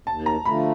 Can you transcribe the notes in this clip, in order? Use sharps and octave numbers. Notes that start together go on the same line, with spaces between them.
D#2 A5
A#5
D3 F3 A3 B5